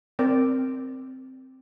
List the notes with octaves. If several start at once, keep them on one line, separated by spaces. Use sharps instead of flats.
C4 A#4 D5 G5